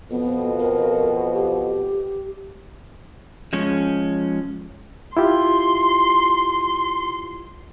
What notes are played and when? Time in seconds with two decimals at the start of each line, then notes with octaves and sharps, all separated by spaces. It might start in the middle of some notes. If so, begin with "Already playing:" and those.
0.11 F2 B2 B3
0.59 A#4
1.33 G4
3.53 F3 G#3 C#4
5.17 E4 F4 G4 C6